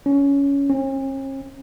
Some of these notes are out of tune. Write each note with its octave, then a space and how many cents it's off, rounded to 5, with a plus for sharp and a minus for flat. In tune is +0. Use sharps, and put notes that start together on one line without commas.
C#4 +15
C#4 -45